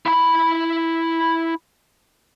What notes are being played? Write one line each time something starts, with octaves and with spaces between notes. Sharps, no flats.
E4 B5